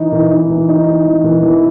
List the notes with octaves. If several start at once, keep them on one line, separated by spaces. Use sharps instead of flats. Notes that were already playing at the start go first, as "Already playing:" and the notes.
Already playing: E3 D#4
E3
D#4
E3
D#4
D#4
E3
E3
E3